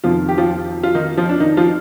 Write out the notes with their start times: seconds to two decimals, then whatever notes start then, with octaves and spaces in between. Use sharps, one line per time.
0.04 F2 C3 D#3 F3 F4
0.29 G4
0.38 F3 F4
0.83 F4
0.95 D#3 D#4
1.17 F3 F4
1.29 D4
1.40 D#3 D#4
1.57 F3 F4